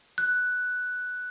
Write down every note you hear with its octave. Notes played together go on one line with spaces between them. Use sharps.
F#6